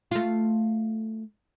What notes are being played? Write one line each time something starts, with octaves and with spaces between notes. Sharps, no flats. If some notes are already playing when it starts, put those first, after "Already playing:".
A3 F4